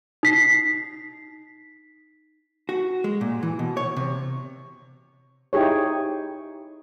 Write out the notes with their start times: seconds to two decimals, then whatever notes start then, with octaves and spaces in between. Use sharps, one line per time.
0.23 D#4 B6 C7
2.69 F#4
3.04 G#3
3.21 A#2
3.43 E3
3.59 B2
3.77 C#5
3.96 C3
5.53 D#4 E4 G4 G#4 C#5